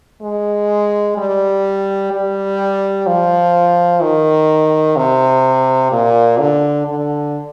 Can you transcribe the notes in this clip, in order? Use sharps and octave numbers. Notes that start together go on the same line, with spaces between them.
G#3
G3
G3
F3
D#3
C3
A#2
D3
D3